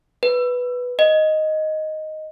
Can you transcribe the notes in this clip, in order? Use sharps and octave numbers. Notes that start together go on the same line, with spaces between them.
B4
D#5